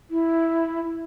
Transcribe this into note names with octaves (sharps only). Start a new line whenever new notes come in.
E4